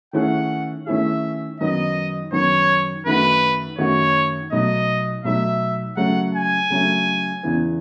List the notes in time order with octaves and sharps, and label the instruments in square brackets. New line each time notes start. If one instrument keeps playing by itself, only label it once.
[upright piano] D#3 A3 C#4 E4 G#4 [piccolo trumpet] F#5
[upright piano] D#3 A3 C#4 E4 G#4 [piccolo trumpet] E5
[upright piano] F#2 D#3 F#3 B3 [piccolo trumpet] D#5
[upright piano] F#2 D#3 F#3 B3 [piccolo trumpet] C#5
[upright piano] F#2 D#3 A3 D#4 F#4 [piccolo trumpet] B4
[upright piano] F#2 D#3 A3 D#4 F#4 [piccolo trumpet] C#5
[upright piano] B2 F#3 A3 D#4 [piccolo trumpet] D#5
[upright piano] B2 F#3 A3 D#4 [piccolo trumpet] E5
[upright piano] C#3 F#3 A3 [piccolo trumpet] F#5
[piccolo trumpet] G#5
[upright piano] C#3 F#3 A3
E2 C#3 E3 B3